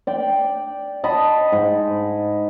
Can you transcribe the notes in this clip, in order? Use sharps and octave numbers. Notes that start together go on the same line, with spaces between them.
D5 G5
D#5 A5 B5
G#2